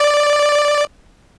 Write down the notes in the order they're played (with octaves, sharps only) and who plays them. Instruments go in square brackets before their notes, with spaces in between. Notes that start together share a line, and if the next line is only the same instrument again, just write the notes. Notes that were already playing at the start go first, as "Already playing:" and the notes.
Already playing: [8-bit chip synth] D5